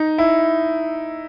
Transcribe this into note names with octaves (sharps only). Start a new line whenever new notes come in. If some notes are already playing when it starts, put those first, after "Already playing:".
Already playing: D#4
E4